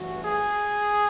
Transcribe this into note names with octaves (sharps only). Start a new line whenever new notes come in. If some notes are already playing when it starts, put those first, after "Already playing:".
Already playing: A1 G2 E3 F#4
G#4